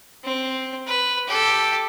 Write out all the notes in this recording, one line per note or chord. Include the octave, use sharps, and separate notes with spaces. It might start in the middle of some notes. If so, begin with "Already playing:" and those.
C4
B4
G4 A4